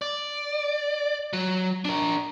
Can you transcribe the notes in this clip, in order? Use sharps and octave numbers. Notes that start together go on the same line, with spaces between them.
D5
F#3
D4 A#4